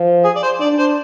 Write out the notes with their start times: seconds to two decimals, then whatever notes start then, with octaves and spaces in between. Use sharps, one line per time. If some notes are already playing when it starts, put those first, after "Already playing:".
Already playing: F3
0.25 G#4
0.36 D5
0.43 C5
0.60 D4 D5
0.79 C5